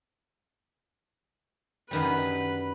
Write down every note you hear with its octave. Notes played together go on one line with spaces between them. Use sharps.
F#2 D#3 G3 B4